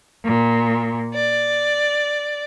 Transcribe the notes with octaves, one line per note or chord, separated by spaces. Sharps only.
A#2
D5